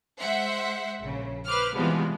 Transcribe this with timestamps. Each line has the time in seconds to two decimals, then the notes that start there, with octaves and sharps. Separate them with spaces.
0.20 G#3 C5 E5 F#5
1.02 A#1 C#3
1.46 B4 C5 D6 F6
1.75 C3 E3 F3 G3 G#3 B3